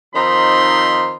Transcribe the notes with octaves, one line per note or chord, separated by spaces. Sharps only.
D#3 F3 C4 D#4 B5 C6